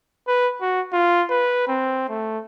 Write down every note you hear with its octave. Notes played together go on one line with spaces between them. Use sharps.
B4
F#4
F4
B4
C4
A3